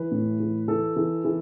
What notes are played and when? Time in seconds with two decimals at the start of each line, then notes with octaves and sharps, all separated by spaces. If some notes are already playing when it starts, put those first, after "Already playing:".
Already playing: E3 B4
0.11 A2
0.40 E3
0.68 E3 A4
0.96 E3
1.25 E3